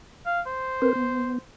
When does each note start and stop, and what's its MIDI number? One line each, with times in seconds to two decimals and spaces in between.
0.26 0.41 77
0.46 1.40 72
0.82 0.93 60
0.82 0.93 70
0.82 0.93 71
0.95 1.38 59